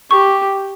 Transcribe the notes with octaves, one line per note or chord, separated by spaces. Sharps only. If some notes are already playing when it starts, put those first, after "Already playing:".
G4 C#6